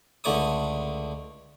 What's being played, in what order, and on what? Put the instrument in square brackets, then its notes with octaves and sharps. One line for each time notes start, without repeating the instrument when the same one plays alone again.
[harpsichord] C#2 D3 A3 D5 D6 D#6